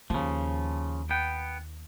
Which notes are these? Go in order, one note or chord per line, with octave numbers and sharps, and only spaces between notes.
D#2 C#3 F3
B3 G5